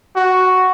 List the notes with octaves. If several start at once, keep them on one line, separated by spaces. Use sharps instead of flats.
F#4